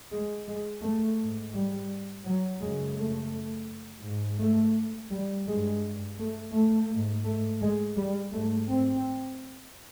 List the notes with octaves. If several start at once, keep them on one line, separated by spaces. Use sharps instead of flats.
G#3
G#3
A3
G#2
G3
F#3
F#2 C#3 G#3
A3
G#2
A3
G3
G2 G#3
A3
A3
G#2
A3
G#3
G3
G#2 A3
C4